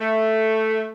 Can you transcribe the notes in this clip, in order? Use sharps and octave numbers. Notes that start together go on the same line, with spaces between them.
A3